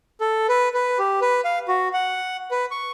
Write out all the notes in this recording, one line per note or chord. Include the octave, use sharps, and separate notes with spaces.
A4
B4
B4
G4
B4
F5
F#4
F#5
B4
C#6